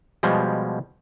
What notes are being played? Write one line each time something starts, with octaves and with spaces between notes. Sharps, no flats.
B2 F3 G3 G#3